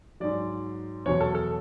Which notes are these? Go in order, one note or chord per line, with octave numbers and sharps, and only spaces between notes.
G#2 F#3 D5
E2 B2 F#3 C#5
A4
A4